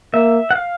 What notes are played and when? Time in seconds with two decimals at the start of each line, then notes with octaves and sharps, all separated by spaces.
0.14 A#3 E5
0.51 F#5
0.56 F5